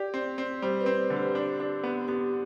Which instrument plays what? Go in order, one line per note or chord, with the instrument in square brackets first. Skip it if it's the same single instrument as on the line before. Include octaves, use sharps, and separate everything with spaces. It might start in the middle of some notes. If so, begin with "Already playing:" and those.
Already playing: [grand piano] G4 [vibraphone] D5
[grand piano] C4
C4
[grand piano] G3 [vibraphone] C5
[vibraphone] B4
[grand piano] C4
D3
[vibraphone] G4
[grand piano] D4
D4
B3
[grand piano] B3 [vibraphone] G4